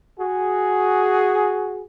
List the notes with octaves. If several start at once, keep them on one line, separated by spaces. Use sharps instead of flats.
F#4 G#4